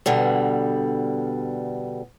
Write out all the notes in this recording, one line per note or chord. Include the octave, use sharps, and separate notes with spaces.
B2 D3 G3